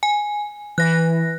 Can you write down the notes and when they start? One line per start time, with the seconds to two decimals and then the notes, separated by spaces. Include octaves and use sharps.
0.03 G#5
0.78 E3 F#6 A#6